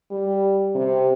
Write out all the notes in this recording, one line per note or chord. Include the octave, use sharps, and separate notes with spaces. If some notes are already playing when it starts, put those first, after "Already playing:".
G3
C3